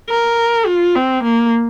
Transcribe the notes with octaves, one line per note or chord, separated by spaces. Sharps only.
A#4
F4
C4
A#3